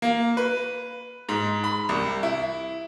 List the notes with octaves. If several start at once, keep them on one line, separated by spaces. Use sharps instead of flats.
A#3
B4
G#2
B5
C2
E4